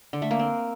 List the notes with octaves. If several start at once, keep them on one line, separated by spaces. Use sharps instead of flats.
D3
A3
A#3
C4